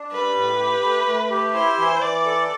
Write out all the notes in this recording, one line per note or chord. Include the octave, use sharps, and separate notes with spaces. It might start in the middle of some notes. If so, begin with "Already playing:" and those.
Already playing: D4
G3 B4
A2
G4
A3
A3
G4
E4 C5
E3
E3 D5
A4